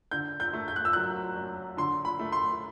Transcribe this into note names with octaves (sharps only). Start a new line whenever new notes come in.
D3 G6
G6
A3
G6
F#6
E6
F#3 F#6
F#2
D3 C6
B5
A3
C6